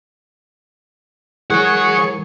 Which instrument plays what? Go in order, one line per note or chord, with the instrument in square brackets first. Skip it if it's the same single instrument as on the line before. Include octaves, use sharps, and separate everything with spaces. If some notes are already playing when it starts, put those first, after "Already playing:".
[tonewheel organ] E3 G#3 A#4 [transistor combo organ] G#4 C#6 [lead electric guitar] C#5 F#5